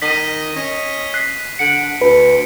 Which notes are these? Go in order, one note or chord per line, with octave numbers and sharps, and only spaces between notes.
D#3 D#5 B6 D#7
C#4 D#5
F#6 B6 C7
D3 F#5 C#7 D7
D2 B4